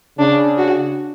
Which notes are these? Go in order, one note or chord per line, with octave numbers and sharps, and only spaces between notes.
C#3 D4
F#4